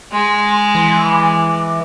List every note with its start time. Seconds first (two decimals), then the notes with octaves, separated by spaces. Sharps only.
0.12 G#3 C6
0.75 E3 C6
1.10 D6